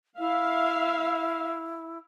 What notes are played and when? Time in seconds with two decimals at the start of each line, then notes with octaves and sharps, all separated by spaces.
0.19 E4 E5 F5